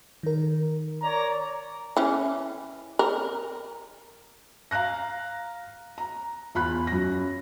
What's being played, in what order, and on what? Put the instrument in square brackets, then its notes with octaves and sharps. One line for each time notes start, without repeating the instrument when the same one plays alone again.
[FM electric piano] D#3 A#4
[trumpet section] C#5 D5 A#5
[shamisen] E3 C#4
A#4
[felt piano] F5 A#5 F#6 A#6
A#5
E2 F4 B5 F#6
F#2 A#6